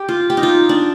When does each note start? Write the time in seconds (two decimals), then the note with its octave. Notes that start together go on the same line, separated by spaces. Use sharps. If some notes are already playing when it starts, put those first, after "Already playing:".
Already playing: G4
0.09 F4
0.30 G4
0.37 D#4
0.43 F4
0.69 D4